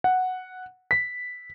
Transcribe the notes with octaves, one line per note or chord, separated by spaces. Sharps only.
F#5
B6